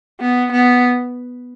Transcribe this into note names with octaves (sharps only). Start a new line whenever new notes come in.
B3
B3